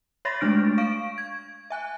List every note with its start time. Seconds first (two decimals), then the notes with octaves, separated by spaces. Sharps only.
0.25 C#5 E5 B5 C6 A6 A#6
0.41 G#3 A3 D4 F6 D7
0.78 F5 C#6 D7
1.18 G#6
1.70 E5 G#5 F#6